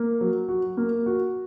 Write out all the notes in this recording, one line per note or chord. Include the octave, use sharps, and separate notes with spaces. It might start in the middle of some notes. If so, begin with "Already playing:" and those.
Already playing: A#3
F#3
F#4
A#3
F#4